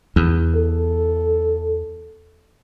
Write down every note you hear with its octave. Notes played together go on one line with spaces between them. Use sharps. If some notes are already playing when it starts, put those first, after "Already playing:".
E2
A4